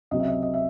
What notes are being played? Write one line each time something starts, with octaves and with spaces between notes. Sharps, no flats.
C#2 C3 F#3 C4 D#5
E5
D#5
D#5
E5